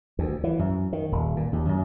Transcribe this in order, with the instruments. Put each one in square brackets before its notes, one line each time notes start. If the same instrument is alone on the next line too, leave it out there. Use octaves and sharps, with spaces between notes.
[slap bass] D2
E3
F#2
D#3
D#1
A#2
D#2
F#2